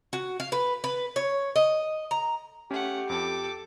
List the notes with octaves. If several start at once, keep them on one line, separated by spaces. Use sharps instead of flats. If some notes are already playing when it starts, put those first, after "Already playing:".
F#4
F5
B4
B4
C#5
D#5
A#5
A3 C#4 G4 F#5
F2 A4 D6